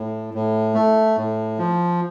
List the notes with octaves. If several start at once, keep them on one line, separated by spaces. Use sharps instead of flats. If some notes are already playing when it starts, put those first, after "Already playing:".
Already playing: A2
A2
A3
A2
F3